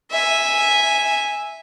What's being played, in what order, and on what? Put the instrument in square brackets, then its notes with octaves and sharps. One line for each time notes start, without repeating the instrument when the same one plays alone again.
[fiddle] E5 G#5